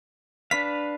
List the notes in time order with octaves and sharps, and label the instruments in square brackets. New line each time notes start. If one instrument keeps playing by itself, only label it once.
[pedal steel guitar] D4 B4 F5 [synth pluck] B6